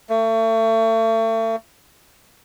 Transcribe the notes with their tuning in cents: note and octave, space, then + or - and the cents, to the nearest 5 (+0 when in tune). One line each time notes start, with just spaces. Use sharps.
A3 +35